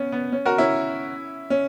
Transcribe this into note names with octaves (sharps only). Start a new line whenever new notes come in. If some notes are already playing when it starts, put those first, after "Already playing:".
Already playing: B3 C#4
B3
C#4
F#4 A#4
C#4 E4
C#4